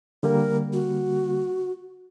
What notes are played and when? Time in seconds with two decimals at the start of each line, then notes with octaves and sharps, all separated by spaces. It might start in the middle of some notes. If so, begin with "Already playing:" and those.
0.23 D3 G3 A#3 A#4
0.73 F#4